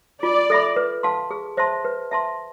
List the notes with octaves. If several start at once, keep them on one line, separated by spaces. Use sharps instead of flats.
F4 D5
A4 E5 B5
B4
F5 A5 C6
G#4
C5 E5 A5 C6
B4
E5 A5 C6